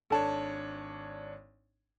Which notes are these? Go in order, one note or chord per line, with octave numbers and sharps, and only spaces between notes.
G#1 D4 A4 C#5 A5